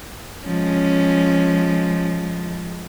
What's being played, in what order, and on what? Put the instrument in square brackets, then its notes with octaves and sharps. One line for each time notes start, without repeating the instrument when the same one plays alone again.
[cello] F3 G#3 [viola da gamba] C#4